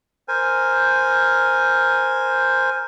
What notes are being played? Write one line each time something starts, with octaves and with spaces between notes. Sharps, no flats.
A#4 C5 G#5